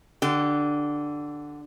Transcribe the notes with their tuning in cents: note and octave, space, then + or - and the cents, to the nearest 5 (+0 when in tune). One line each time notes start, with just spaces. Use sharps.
D3 +5 G4 -25